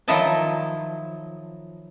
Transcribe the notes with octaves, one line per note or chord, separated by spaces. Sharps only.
D#3 F3 F#3 E4 D#5 A5